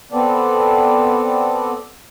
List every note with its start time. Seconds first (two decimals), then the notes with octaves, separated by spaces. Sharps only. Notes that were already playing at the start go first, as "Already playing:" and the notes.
0.12 B3 C4 A4 D5